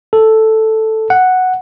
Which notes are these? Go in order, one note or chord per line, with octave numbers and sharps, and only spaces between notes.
A4
F#5